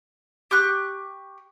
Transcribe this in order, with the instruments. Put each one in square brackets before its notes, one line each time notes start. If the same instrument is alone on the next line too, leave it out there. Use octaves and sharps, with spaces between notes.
[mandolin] G4 C#6 F#6